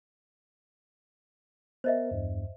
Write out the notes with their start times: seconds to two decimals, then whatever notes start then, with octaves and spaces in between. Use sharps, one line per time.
1.84 B3 A#4 C5 D#5 E5
2.11 E2 G2